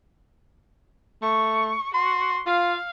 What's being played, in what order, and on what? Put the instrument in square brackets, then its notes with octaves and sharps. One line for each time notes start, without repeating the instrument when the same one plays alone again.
[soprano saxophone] A3 [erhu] C#6
[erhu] F#4 [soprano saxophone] C6
[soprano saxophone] F4 [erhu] F5